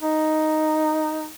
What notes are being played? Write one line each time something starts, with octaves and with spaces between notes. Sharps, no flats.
D#4